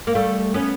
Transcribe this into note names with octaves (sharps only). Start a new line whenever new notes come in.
A#3
G3 A3
B3 C#4